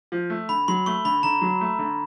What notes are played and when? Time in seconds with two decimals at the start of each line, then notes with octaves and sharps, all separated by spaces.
0.12 F3
0.30 A3
0.49 D3 B5
0.68 F#3 C6
0.86 A3 C#6
1.05 D3 B5
1.23 D3 A#5
1.42 F#3
1.61 A3
1.79 D3